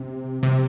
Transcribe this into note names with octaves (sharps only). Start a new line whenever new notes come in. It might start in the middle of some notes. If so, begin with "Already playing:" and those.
Already playing: C3
C3